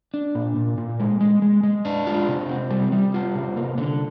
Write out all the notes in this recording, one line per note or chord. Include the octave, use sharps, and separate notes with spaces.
D4
A#2
A#2
A#2
G#3
G#3
G#3
G#3
D4
F4
C3
C4
G3
G3
F4
C3
A#3
D3